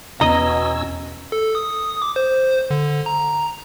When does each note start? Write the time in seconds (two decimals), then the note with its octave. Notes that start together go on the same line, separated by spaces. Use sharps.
0.21 E2 B2 C#4 D#5 A#5 E6
1.32 A4
1.55 D#6
2.02 D6
2.16 C5
2.70 D3
3.06 A#5